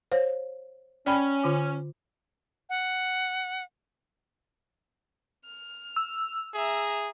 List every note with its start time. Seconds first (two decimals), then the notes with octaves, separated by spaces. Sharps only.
0.12 C5 C#5 F5
1.06 C#4 D5 G5 B5
1.43 D3 F4 D6
2.69 F#5
5.45 F6
5.96 E6
6.54 G#4 E5 A#5